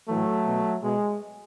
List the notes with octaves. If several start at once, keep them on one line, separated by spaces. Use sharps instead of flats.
A2 E3 F#3 A3
B2
B2 G#3